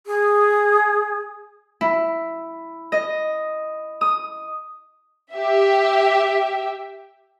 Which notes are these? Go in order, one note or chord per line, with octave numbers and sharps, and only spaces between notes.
G#4
E4
D#5
D#6
G4 E5